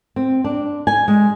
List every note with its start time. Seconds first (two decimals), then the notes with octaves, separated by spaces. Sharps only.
0.16 C4
0.44 D4
0.87 G#5
1.08 G#3